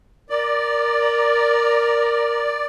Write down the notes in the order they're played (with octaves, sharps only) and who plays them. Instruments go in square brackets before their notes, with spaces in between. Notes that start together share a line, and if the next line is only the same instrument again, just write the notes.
[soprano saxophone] A#4 [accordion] D5